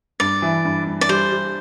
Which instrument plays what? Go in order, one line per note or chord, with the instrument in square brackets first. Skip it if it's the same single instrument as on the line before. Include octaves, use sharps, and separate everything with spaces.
[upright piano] G2 [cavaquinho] D5
[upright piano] E3
G2
G2
[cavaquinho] D5
[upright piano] G3 [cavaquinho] C5
[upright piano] G3